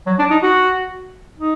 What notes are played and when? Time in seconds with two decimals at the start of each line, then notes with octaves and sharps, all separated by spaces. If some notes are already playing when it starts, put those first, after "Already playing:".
0.07 F#3
0.19 D4
0.30 D#4
0.42 F#4
1.38 D#4